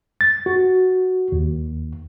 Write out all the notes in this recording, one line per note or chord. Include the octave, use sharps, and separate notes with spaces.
A6
F#4
D#2